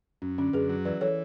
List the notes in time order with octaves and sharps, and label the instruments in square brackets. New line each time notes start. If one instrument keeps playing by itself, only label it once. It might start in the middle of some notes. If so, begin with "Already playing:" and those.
[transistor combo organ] F#2 [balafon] C#4
[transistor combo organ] D3 [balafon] C#4
[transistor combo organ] F#2 [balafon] G#4 B4
[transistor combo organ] F#3
[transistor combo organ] E3 [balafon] B4 D5
[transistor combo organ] E3 [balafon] A4 C#5